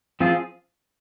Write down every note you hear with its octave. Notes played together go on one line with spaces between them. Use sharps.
F3 C4 F4 G#4